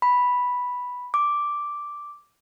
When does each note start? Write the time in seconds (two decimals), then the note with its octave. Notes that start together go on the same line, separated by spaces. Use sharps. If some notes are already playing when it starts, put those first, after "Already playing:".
0.02 B5
1.14 D6